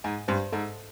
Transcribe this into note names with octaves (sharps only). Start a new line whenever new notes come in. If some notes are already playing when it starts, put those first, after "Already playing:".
G#2 G#5
G2 C5
G#2 A4